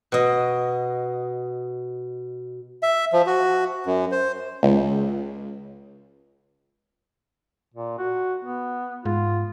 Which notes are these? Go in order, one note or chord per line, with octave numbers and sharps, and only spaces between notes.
B2 D#5
E5
F3
F#4
F#2
C5
C#2
A#2
F#4
B3
G#2 F4